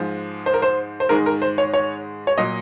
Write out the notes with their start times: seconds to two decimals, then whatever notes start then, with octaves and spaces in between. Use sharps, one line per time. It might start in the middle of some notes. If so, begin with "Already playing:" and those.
Already playing: G#2 F3 G#3
0.46 C5
0.54 A#4
0.62 C5
1.00 C5
1.09 G#2 D#3 G#3 A#4
1.26 A#4
1.42 C5
1.58 C#5
1.74 C#5
2.27 C#5
2.38 A#2 F#3 D#5